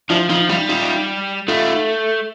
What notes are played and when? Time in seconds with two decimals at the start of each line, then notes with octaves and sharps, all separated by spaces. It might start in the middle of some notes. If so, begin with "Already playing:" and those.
0.10 F3 D4 E4
0.29 F3 D#4 F4
0.49 G3 D#4 F4
0.69 D#4 F4
1.48 A3 D#4 F4